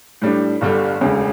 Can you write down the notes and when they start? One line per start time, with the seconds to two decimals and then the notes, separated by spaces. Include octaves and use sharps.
0.22 A2 G3 D4
0.61 G1 G2 D3 G3
1.01 E1 D2 C#3